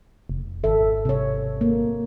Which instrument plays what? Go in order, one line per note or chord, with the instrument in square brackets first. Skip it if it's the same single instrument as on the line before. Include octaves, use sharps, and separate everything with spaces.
[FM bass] F1
[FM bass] G#1 [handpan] A4 E5
[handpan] C3 C#5
A#3